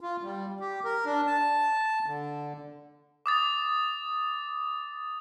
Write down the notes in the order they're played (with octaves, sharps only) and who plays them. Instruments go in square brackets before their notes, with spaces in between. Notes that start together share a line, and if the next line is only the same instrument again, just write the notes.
[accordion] F4
G3
G4
A#4
D4
A5
D3
[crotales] D6 D#6 A6